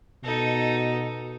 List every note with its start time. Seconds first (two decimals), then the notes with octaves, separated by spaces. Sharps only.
0.24 B2 D#4 A4